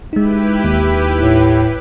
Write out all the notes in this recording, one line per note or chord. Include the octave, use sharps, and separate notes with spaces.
G#3 D#4 E4 G4 B4
D#2
A2